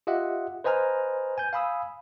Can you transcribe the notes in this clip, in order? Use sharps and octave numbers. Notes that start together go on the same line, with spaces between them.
F4 G4 D#5 E5 F#5
B4 C5 D#5 G#5 A#5 F6
G#5 G6
F5 G#5 B5 D#6 E6